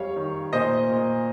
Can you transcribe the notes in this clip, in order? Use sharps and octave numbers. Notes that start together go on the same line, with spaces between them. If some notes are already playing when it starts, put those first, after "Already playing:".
Already playing: F2 G3 C#5 F5
D#3
A#2 C5 D#5
A#2